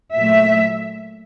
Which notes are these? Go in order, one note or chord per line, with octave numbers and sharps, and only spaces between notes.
A#2 F#3 A3 E5